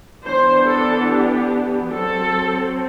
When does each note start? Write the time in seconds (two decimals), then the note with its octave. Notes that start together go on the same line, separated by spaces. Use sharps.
0.24 E3 B3 D4 C5
0.67 A4
1.10 G4
1.95 F#3 C4 A4